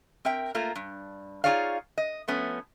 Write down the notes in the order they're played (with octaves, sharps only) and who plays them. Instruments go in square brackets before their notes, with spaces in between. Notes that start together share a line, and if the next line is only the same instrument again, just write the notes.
[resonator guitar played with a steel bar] C4 A#4 E5 G5
A3 A#3 F4 A#4
G2
D#4 F4 G#4 C#5 D5 F5
D#5
F3 A3 B3 C#4